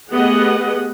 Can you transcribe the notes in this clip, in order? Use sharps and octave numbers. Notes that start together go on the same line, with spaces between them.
A3 B3 G4 G#4 D#5 F#5